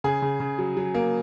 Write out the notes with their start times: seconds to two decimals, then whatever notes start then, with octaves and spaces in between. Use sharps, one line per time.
0.04 C#3 G#4
0.22 C#3
0.40 C#3
0.59 F#3
0.77 F#3
0.94 A#3